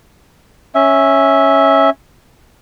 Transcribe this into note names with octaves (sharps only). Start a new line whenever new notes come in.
C#4 E5